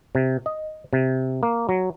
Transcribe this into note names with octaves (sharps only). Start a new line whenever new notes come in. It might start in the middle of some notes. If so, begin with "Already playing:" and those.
C3
D#5
C3
A#3
F#3